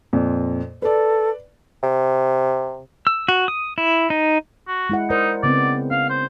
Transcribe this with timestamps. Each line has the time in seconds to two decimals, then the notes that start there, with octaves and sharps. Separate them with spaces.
0.13 F2 A#2
0.82 A4 B4 D5
1.83 C3
3.07 E6
3.28 F#4
3.48 D#6
3.78 E4
4.10 D#4
4.68 F#4
4.90 G#3 E4 F#5
5.10 D#4 A#4 C5 D5
5.43 C#3 B3 C4 D5
5.91 C#4 F5
6.10 C5